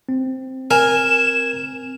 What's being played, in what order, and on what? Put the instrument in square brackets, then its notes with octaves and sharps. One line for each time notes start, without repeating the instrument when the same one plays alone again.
[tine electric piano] C4
[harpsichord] A#4 [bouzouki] G#5 [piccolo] E7